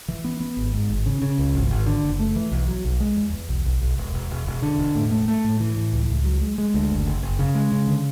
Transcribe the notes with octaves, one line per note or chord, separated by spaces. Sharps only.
E3
B3
B3
G#1
G#2
G#1
C#3
C#3
C#2
G#1
G#1
D3
F#1
A3
E3
B1
F#3
B1
G#3
E2
E2
B1
B1
B1
E1
E1
E1
E1
D3
E1
A2
A3
A3
A2
E3
A2
C#2
C#2
F#3
G#3
G#3
D2
F#1
F#1
F#1
C#3
G#3
C#3
D3